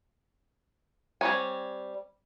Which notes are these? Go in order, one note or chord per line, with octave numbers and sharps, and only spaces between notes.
G3 C4 B4 C#5 G#5